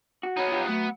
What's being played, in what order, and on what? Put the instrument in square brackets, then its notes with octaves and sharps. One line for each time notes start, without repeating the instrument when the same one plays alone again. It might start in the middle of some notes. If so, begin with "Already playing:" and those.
[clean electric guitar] F#4
[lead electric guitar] B3 D#4 [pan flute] C#5
[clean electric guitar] F3 F4 G4
[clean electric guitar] F#3 [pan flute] A3 [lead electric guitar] B3